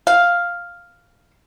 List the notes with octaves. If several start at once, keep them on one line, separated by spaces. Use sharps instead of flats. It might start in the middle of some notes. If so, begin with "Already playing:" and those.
F5